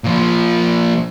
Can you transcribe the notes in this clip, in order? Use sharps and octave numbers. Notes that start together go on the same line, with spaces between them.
A#2 F3